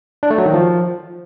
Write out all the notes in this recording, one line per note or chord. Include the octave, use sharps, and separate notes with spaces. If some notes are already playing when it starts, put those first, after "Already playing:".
D4
A3
F#3
D#3
F3